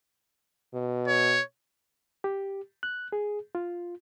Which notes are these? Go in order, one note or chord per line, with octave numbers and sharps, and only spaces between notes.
B2
C#5
G4
F#6
G#4
F4